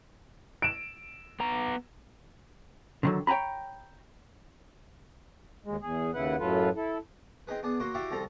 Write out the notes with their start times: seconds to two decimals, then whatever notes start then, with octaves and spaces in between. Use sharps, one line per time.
0.62 D7 E7
1.40 B3 A#5
3.03 D3 D#3 F#3
3.27 C#5 G5 G#5 A#5 B5
5.65 D#2 G#3
5.82 E2 G#4
6.14 D#2 C#3 E4 B4 F#5
6.39 F#2 A2 F#3 F4 A4 B4
6.76 E4 A4
7.47 C4 D#4 G#4 B4
7.63 B3 D4 G#4
7.80 F#3 A#3 F#4 C6
7.94 E4 F#4 G4 D5 E5 F5
8.11 C2 F3 C4 A4 A#5